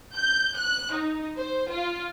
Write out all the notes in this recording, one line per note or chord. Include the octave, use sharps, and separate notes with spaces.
G6
F#6
D#4
C5
F4